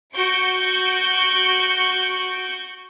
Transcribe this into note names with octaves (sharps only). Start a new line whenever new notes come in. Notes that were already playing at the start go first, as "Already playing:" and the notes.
F#4 C#6 G6 D7